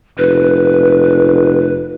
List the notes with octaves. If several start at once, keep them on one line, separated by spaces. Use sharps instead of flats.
F1 B4